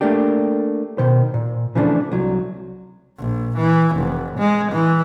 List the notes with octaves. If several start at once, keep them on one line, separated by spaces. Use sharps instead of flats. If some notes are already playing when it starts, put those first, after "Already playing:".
A3 A#3 D4 G4
B2 D#3 C5
A#2
C#3 E3 F3 A3 B3 D4
C2 F#3
A#1
E3
F1
G#3
E3